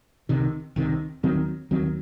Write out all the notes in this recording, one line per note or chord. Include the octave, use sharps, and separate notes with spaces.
C2 C3 D#3
C2 C3 D#3
D#2 D#3 F#3 C4
D#2 D#3 F#3 C4